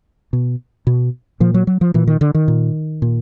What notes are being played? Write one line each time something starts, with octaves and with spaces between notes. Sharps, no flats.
B2
B2
A#2 F3
F#3
F#3
F3
A#2 E3
D#3
D3
D#3
A#2
A#2